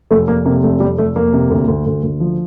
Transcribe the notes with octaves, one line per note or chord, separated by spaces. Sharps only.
F1 A3
F1 A#3
C3 A#3
F1 A3
F1 G3
F1 A3
F1 A#3
C3
D2
D2
D2
D2
F3